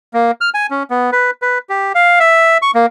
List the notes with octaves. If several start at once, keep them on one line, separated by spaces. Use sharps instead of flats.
A#3
F6
G#5
C#4
B3
B4
B4
G4
F5
E5
C#6
A#3